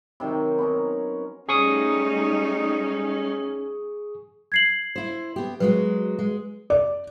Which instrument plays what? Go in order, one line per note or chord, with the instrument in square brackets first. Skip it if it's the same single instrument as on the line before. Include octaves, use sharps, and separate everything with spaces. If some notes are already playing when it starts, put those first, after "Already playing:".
[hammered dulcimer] C3 D#3 F#3
B3 C#4 A#4
[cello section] G3 A3 D#4 [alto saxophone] C#4 [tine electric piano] G#4 C#6 D#6
[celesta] G#6 C7 F#7
[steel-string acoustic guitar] E4 C5
B3 G4
[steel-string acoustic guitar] F#3 G#3 F#4 [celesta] B4
[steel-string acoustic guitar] G#3
[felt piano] D5